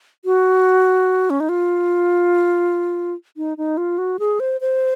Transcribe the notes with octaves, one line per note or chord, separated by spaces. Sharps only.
F#4
C#4
D#4
F4
D#4
D#4
F4
F#4
G#4
C5
C5